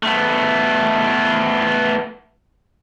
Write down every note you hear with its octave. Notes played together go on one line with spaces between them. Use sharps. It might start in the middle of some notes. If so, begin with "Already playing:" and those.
A3 B3